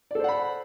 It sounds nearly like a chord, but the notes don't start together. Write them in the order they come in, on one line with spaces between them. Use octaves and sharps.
D5 A4 C5 F#5 B5